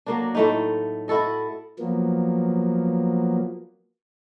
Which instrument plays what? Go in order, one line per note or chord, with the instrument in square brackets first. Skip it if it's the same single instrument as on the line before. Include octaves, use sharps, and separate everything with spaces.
[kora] F#3 A#3 D4
A2 A3 D#4
E4 F#4 A4 D#5
[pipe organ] F3 F#3 A#3 B3